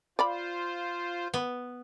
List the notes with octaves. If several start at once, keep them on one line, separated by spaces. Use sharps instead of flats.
F4 C5 D5 F5 B5
B3